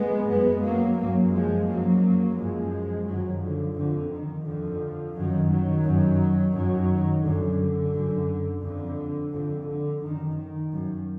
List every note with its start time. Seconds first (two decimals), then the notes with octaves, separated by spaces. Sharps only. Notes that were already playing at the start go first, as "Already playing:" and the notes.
Already playing: G#3 B3
0.30 F#2 G#3 B3
0.64 F#3 A#3
0.99 F#2 F#3 A#3
1.34 F3 G#3
1.69 F#2 F#3 A#3
2.38 F#2 F3 G#3
3.08 F#2 D#3 F#3
3.42 D3 F3
3.77 F2 D3
4.11 D#3
4.46 F2 D3 F3
5.16 F#2 D#3 F#3
5.51 D#3 F#3
5.85 F#2
6.55 F#2 D#3 F#3
7.24 F#2 D3
7.94 F#2
8.63 F2 D3
9.33 F2 D3
9.67 D3
10.02 F#2 D#3
10.37 D#3
10.72 F#2